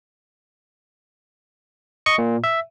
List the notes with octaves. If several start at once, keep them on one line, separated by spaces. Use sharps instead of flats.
D#5 C#6 C#7
A#2
E5